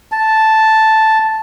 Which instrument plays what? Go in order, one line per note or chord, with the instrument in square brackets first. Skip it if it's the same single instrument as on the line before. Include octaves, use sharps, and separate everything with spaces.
[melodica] A5